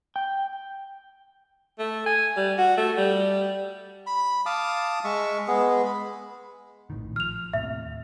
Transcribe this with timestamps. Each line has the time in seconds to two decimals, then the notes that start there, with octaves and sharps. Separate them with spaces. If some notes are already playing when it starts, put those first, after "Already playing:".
0.16 G5
1.79 A3
2.06 G#5
2.36 G3
2.58 F#4
2.77 A3
2.98 G3
4.07 B5
4.46 F5 A5 D6 D#6
5.04 G#3 E5 C#6
5.48 G#3 B3 G#4
5.85 B5
6.90 A#1 A2 D#3
7.16 F3 F6 F7
7.53 D#2 A2 C3 E5